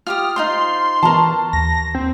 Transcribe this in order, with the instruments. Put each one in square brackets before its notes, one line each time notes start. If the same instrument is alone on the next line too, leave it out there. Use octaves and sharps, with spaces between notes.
[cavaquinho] F4 G4 D#6 [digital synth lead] F6
[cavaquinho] D#4 F4 C5 [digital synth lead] C6
[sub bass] E3 [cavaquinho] A#4 C#6 [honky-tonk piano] A5
[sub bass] D#2 [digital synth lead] A#6
[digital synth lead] C4